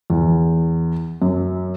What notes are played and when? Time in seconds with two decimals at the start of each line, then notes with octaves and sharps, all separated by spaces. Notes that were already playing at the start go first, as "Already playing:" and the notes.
0.10 E2
1.22 F#2